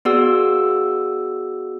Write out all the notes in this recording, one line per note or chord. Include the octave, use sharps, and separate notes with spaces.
B3 F#4 G#4 D5 F#5 E6